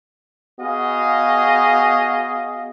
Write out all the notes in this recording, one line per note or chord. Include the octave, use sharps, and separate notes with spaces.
B3 F#4 G#4 D#5 F5